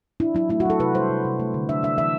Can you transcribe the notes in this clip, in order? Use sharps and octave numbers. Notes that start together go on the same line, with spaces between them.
D4 E4
F#3 E4
A3 E4
F#4
F#3 A4
C3 B4
G3 C5
C3
C3
A3
D3
D4 E5
D4 E5
E3 E5